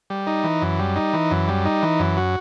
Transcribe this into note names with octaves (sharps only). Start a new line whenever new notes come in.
G3
D#4
E3
F#2
G3
D#4
E3
F#2
G3
D#4
E3
F#2
F#4